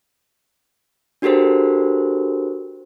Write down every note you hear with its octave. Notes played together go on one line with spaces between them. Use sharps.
D4 F#4 G4 A4 A#4 C5